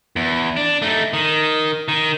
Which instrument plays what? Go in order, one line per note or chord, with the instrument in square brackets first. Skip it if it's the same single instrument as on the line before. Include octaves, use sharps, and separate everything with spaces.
[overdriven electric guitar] E2
D4
A3 D#4
D#3
D#3